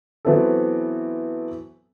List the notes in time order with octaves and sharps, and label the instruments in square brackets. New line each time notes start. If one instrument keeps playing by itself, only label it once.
[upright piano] E3 F#3 B3 C4 E4 A4